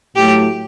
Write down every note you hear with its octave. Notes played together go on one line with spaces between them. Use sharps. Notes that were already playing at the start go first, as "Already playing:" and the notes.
A2 F#3 A3 G4